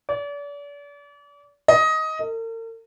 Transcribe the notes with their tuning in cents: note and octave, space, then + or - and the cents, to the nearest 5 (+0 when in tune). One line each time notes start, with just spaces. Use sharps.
D5 -40
D#5 +15
A#4 -45